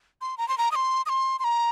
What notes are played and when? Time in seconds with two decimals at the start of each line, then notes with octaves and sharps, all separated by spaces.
0.21 C6
0.38 A#5
0.48 C6
0.58 A#5
0.72 D#6
0.75 C6
1.06 D#6
1.09 C6
1.39 C6
1.44 A#5